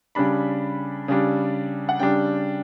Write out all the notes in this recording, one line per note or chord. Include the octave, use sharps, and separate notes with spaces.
C#3 G3 D4 B5
C#3 G3 D4
F#5
C#3 G3 D4 G5